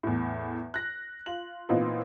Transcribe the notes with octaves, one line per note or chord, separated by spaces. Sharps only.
E2 A2
F#6 A#6
F4 F#7
A#2 E3 B3 C4 D#4 F4